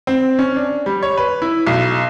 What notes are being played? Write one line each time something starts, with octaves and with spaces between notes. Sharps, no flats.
C4
C#4
D4
G3
C#5
B4
E4
B1